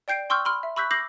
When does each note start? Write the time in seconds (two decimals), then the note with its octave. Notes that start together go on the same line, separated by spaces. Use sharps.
0.08 D5 G5 G6 C7 D7
0.30 G5 C6 C#6 E6 F6 G6
0.45 B5 C6 F6
0.63 E5
0.76 B5 C#6 E6 F#6 G6 B6
0.91 D6 E6 G6 A#6 C7 F#7